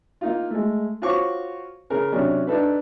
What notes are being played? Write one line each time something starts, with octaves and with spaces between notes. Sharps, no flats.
A#3 D#4 F4
G#3 A3
F4 F#4 C5 C#5 C#6 D6
C#3 A#4
C3 F#3 C#4 D4
D4 D#4 A4 B4